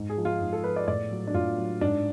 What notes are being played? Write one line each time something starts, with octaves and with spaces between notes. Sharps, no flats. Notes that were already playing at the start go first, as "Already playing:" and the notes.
Already playing: G#2
G#4
F3
F4
G#2
A4
F3 B4
D5
A2 D5
F#3
D4
A2 F4
F#3
G#2 D4